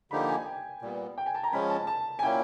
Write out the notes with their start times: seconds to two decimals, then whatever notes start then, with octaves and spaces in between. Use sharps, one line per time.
0.11 D3 F3 A#3 D#4 G4 B5
0.29 G#5
0.46 G5
0.82 A#2 G3 B3
1.18 G5
1.26 G#5
1.35 A5
1.43 A#5
1.53 F3 G#3 C#4 B5
1.70 A5
1.87 A5
2.19 G#5
2.23 A#2 F#3 A#3 C#4 E4 G5